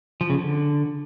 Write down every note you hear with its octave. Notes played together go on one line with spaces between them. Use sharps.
F3
C#3
D3